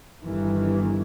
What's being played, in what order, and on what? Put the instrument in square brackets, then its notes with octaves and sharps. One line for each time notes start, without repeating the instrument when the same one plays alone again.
[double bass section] G1 D#3 E3